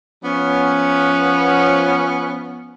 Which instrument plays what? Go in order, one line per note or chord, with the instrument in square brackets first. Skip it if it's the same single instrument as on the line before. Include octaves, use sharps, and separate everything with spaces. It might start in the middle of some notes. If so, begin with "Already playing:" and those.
[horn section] F3 B3 C#4